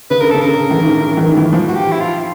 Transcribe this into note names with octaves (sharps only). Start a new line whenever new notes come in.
C#3 B4
D3 A#4
C#3 A4
A#4
E3
D#3
E3
D#3
E3
F3
F#4
G4
E4
F4